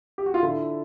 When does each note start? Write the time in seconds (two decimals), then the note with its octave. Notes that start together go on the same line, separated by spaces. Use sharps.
0.18 G4
0.26 F#4
0.34 F4
0.43 D3 E4